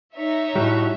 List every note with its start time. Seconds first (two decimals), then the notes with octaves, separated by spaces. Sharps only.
0.15 D#4 C#5 E5
0.55 A2 G3 F#4